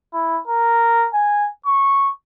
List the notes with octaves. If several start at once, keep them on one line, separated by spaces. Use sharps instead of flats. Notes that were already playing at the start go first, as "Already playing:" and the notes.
E4
A#4
G#5
C#6